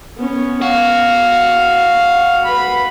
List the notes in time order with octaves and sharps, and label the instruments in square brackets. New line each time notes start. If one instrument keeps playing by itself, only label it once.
[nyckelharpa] B3 C#4
[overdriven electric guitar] F#4 [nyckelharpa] F5
[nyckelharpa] B4 B5